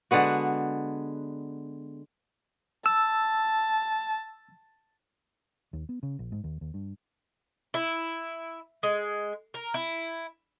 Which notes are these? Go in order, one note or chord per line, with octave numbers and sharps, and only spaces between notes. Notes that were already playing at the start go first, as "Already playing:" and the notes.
D3 G#3 B3 F#4
A5 E6
D#2
B3
C#3
A#1
G#2
D#2
D#2
G2
E4
G#3
A#4
E4